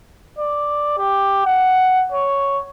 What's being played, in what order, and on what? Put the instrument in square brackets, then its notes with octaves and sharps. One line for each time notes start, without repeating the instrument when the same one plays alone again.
[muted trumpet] D5
G4
F#5
C#5